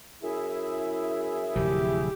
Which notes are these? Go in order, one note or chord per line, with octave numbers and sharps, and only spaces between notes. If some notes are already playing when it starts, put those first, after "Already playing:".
F#2 E4 G#4 E5
D1 C3 F3 G4